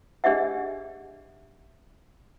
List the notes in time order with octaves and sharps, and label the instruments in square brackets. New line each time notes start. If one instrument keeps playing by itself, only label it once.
[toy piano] D4 G4 G#4 D#5 E5 F#5